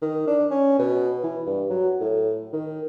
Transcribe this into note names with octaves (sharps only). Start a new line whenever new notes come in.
D#3
D4
C#4
B2
E3
G2
F#3
A2
D#3